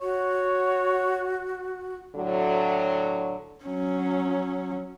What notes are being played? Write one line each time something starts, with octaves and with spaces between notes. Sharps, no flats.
F#4 C#5
A2 D3 F#3
F#3 C#4